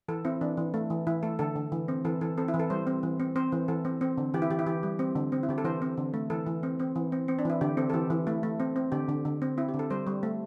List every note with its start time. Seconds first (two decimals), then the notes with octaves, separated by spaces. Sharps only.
0.08 E3 A4
0.25 C4 E4
0.41 E3 D4
0.57 E3
0.74 A3
0.90 E3
1.07 E3 E4
1.23 A3 A4
1.39 D3 A4
1.56 D3
1.72 E3
1.88 C4
2.05 E3 A4
2.21 E3 A4
2.38 C4 A4
2.48 E4
2.54 E3
2.59 A4
2.70 G3 C5
2.87 C4
3.03 E3
3.20 C4
3.36 C4 C5
3.52 E3
3.68 E3 A4
3.85 C4
4.01 C4
4.18 D3
4.34 E3 G4
4.42 E4
4.50 E3 G4
4.59 E4
4.66 E3 G4
4.83 G3
4.99 C4
5.16 D3
5.32 C4
5.43 E4
5.49 D3 G4
5.58 A4
5.64 E3 C5
5.82 C4
5.97 D3
6.14 A3
6.30 E3 A4
6.47 E3
6.63 C4
6.80 C4
6.96 E3
7.12 C4
7.28 C4
7.39 D4
7.45 E3 E4
7.61 D3 G4
7.77 C4 A4
7.90 A4
7.94 E3 G4
8.10 E3
8.27 A3 E4
8.43 A3
8.60 C4
8.76 C4
8.92 D3 G4
9.09 D3
9.25 D3
9.42 C4
9.58 C4 E4
9.69 G4
9.74 D3
9.79 A4
9.90 G3 C5
10.07 G3
10.23 A3